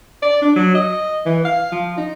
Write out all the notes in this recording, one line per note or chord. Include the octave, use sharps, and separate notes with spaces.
D5
D4
F#3
D#5
E3
F5
F3
D#4